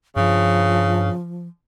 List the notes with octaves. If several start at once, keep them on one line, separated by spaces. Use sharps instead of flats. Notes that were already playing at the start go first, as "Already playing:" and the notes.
G2 C#3 F3